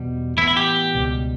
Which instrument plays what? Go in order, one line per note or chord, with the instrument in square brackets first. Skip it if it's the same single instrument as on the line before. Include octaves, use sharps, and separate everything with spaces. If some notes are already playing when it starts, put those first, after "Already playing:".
Already playing: [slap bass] E2 B2 G3
[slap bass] A2 E3 B3 [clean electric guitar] E4
[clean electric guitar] E4
G4
[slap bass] C#2 B2 G3